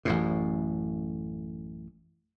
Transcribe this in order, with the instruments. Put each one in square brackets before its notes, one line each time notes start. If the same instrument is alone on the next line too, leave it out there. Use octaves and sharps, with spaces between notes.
[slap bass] A1 F#2 A2